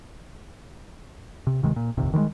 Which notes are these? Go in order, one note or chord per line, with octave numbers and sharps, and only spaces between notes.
C3
D1 C3 D#3 G#3
A#2
F1 A#1 D#2 C3
D#3 E3 G3 G#3